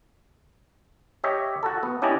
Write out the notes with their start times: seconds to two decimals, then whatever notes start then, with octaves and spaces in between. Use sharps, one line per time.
1.24 G4 C#5 D#5 E5
1.63 F#4 A4
1.83 B3
2.02 C#4 D4 E4 G4 D5 D#5